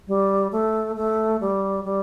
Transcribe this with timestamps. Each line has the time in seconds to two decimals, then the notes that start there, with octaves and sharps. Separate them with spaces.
0.08 G3
0.52 A3
0.97 A3
1.41 G3
1.85 G3